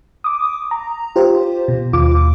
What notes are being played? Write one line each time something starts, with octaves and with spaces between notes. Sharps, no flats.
D6 D#6
A#5
F4 G4 C5
B2
D#2 F4 D6